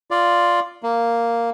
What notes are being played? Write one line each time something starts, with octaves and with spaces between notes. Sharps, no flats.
F4 D5
A#3